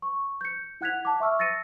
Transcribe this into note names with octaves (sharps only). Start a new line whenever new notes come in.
C#6
G6 C#7
E4 F#5 F#6 G#6 B6 F7
A5 D6
E5 C#6 E6 F6
E6 A6 A#6 C#7 D#7